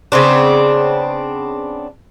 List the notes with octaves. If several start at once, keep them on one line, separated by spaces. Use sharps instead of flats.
C#3 B3 C4 D4